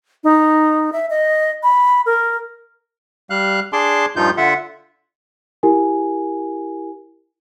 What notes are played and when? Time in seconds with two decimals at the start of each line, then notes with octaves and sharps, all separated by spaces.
0.24 D#4
0.93 E5
1.10 D#5
1.63 B5
2.06 A#4
3.30 G3 F5 F#6
3.73 D4 G#4 A5 C6 D6
4.16 G2 A#2 F3 D#4 F4 G6
4.37 D3 F4 E5 F#5
5.63 E4 G4 A#4 G#5